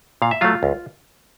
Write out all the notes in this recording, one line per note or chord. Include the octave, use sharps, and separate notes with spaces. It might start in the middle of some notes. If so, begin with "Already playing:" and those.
A#2 F5
E5
F#3 A3 F4 F5
C#2